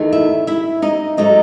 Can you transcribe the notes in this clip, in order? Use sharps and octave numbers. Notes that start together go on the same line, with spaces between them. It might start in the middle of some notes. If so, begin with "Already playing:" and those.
Already playing: E2 D#3 A3 D#4
E4 E5
E4 E5
D#4 D#5
G#2 F#3 A3 D#4 D#5